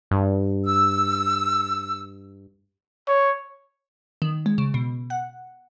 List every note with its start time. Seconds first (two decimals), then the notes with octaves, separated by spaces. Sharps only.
0.11 G2
0.65 E6
3.08 C#5
4.22 D#3
4.46 G#3
4.58 C#3
4.74 B2
5.10 F#5